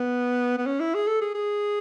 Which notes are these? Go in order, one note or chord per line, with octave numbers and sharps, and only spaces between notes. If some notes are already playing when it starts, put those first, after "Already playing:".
Already playing: B3
B3
C#4
E4
G#4
A4
G#4
G#4